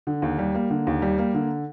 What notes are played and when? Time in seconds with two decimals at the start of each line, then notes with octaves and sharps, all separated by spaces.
0.07 D3
0.22 D#2
0.39 G3
0.55 A#3
0.70 D3
0.87 D#2
1.02 G3
1.18 A#3
1.34 D3